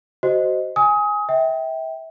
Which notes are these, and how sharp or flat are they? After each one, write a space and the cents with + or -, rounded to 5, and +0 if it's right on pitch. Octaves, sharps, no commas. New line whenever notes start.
F#4 +25 C5 +0 D#5 +0
G#5 -5 D#6 +25
E5 -30 G5 +0